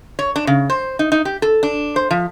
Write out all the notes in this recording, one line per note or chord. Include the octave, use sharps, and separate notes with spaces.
C#5
D4
C#3
C5
D#4
D#4
G4
A4
D4
C5
F3